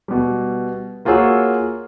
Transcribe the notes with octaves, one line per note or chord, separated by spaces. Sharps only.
B2 G3
A#3 F4 F#4 G#4 C#5 E6